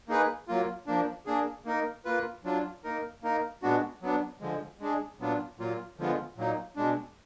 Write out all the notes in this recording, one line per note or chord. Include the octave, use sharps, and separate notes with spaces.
A#3 D#4 G#4 B4
F#3 A#3 F4
F3 A#3 D4
A#3 D4 G#4
A#3 D#4 A#4
A#3 F4 B4
F#3 D4 F4
A#3 D#4 A#4
A#3 D#4 A#4
A#2 G#3 B3 D4 F#4
F#3 B3 D4
D3 F3 G#3
G#3 D4 G#4
A#2 F#3 B3 D4 F4
A#2 F#3 A#3 F4
D3 F3 G#3 B3 F4
A#2 F#3 A#3 D#4
B2 G#3 D4